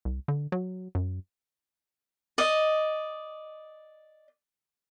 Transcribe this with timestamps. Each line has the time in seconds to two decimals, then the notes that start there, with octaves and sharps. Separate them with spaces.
0.05 C2
0.28 D3
0.52 F#3
0.95 F#2
2.38 D5 D#5